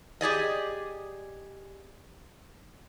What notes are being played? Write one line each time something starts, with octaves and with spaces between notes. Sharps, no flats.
G4 G#4 D5 D#5